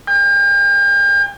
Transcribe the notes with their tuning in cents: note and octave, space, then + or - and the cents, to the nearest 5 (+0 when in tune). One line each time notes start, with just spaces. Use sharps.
G5 +40